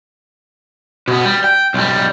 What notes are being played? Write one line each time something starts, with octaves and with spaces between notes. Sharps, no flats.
B2 B3
G3
G5
B1 G3